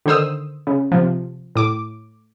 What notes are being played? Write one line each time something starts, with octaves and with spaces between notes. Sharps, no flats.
D3 D#3 C5 D#6 E6
C#3
C3 F3
A2 D6